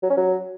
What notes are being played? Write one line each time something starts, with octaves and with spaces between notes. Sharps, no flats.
F#3
C#4
F#3